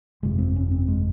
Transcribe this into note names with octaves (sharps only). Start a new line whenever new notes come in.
G1 F2 C3 G#3
C4
C#4
C4
G#3